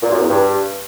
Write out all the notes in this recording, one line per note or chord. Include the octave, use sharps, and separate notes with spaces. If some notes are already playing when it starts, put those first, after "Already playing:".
A#2
F#2
E2
G2